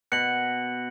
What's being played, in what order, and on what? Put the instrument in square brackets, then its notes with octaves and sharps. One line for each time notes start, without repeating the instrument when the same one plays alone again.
[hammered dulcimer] B2 [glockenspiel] F#6 C#7 F#7